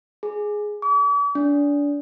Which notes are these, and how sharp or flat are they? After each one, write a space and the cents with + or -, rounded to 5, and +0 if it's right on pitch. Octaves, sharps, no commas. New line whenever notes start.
G#4 +5
D6 -45
D4 -30